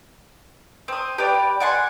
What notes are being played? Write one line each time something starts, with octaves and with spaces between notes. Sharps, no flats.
C4 D#6
G4 B4 D5
D5 F#5 G#5 C6